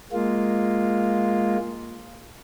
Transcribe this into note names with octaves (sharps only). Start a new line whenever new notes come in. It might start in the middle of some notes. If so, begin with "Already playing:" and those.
G#3 A#3 F4